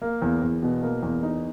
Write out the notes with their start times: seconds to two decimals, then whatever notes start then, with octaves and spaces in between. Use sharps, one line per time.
0.02 A#3
0.22 E2
0.42 E2
0.62 B2
0.83 A#3
1.03 E2
1.23 D#4